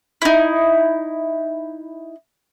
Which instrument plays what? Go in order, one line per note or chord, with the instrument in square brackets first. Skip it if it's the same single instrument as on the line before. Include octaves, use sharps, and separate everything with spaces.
[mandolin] D#4 E4